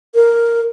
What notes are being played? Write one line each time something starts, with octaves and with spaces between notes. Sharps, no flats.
A#4